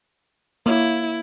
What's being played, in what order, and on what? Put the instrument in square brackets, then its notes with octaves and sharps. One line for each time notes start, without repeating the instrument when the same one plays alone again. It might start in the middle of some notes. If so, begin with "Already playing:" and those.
[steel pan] A#3 C#5 [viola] E4